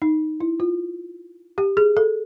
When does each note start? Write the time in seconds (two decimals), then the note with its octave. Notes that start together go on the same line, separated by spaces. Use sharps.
0.02 D#4
0.40 E4
0.60 F4
1.58 G4
1.77 G#4
1.97 A4